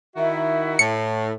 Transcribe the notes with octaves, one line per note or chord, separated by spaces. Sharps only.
D#3 E4 F#4 E5
A2 C#7